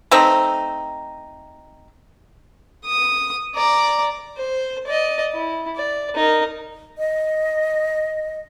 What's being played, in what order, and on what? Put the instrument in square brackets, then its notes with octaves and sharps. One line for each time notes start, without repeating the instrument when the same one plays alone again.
[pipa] A3 C4 D#4
[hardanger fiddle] D#6
D5 A#5
C5
D5 D#5
E4
D5
D#4 A#4
[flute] D#5